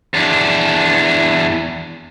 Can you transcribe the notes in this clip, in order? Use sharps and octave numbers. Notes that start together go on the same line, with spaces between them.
E2 D4